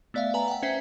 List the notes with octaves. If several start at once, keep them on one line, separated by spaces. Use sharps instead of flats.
A3 B3 D5 E5 F5
B4 G#5 A#5
F#5 G5
C#4 B4 C5 E5 B6 C7